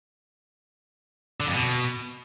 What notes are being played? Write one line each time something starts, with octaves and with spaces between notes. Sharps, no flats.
D3
F2
B2